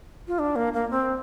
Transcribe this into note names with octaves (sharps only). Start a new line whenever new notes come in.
F4
D4
A#3
A#3
C4